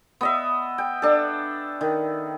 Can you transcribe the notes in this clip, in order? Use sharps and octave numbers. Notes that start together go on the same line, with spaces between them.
B3 D#5 E5
G5
D4 A4
D#3